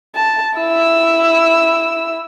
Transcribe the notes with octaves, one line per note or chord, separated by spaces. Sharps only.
A5
E4 E6